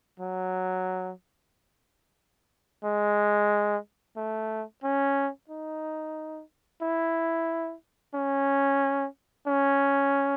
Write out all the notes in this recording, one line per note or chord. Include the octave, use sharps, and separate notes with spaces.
F#3
G#3
A3
C#4
D#4
E4
C#4
C#4